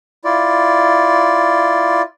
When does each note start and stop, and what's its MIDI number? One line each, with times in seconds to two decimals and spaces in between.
0.24 2.02 64
0.24 2.02 65
0.24 2.02 74